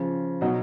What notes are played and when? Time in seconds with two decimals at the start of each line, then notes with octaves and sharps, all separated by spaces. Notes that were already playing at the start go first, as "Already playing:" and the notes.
Already playing: C#3 F3
0.41 B2 F#3 D#4 F#4